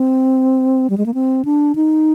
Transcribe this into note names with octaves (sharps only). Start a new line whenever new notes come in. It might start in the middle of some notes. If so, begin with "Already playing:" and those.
Already playing: C4
G3
G#3
A#3
C4
D4
D#4